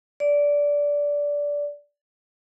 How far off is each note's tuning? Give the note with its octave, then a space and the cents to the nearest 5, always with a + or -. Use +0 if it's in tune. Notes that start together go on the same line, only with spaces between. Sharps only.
D5 -15